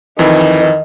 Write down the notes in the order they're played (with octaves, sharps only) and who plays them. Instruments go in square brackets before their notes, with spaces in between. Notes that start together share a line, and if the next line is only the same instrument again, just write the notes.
[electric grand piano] F2 E3 [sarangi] D#3